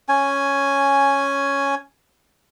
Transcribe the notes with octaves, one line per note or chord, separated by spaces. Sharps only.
C#4 G#5